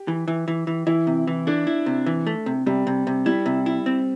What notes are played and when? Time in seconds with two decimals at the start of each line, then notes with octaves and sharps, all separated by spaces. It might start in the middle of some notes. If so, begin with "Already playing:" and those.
Already playing: G4
0.08 E3
0.28 E3
0.48 E3
0.67 E3
0.87 E3 E4
1.07 C3
1.27 E3
1.47 D4 E4
1.67 E4
1.86 C3
2.06 E3
2.27 A3
2.46 C3
2.66 C3 G3
2.87 C3
3.07 C3
3.26 G3 E4
3.46 C3
3.66 E4
3.86 C4